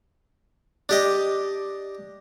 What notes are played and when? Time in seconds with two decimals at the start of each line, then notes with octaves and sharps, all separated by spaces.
0.89 D4 G4 D#5